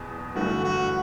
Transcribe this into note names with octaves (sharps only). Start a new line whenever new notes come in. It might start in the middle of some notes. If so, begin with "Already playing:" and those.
Already playing: F#1 E2 B2
G1 G2 E3 A3 F#4
F#4